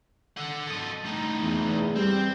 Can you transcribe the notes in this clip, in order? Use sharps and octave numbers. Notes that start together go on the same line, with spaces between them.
A4 F#5
A4 D#5
A2 D#4
E2
G3 C4